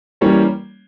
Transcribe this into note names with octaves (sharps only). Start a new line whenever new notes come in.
E3 G3 A#3 C#4 C#5